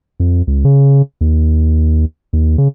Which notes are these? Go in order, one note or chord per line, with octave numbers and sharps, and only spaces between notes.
F2
C#2
C#3
D#2
D#2
C#3